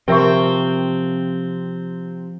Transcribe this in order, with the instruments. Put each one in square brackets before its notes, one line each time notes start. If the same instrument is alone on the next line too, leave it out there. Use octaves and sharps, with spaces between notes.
[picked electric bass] C3 [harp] F3 [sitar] C4 [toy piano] A#4 E5 C#6